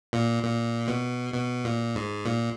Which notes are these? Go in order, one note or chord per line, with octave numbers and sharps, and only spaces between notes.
A#2
A#2
B2
B2
A#2
G#2
A#2